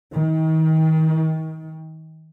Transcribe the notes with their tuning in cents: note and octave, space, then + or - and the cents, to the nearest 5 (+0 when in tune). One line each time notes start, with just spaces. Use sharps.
D#3 +35